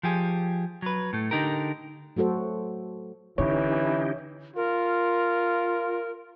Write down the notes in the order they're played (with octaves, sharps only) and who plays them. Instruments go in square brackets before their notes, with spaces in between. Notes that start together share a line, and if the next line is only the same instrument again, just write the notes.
[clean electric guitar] F3 G4 G#4
F#3 B4
A2 A3
D3 D#4 G4 A#4
[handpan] F#3 A3 F#4 A4 C5
[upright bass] D3 [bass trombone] E3 [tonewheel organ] C#4 D#4 G4 [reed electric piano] C#5
[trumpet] F4 [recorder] A#4